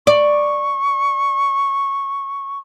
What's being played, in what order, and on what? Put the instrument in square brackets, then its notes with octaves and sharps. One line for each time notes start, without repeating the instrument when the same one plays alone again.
[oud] D5 [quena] C#6